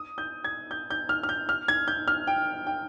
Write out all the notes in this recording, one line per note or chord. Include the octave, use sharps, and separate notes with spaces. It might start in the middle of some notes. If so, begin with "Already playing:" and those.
Already playing: D#6
G6
G#6
G6
G6
F6
F6
G6
F6
G#6
G6
F6
G5
G5